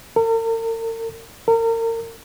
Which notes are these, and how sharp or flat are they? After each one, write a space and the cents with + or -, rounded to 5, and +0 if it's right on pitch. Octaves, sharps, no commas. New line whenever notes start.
A#4 -45
A#4 -35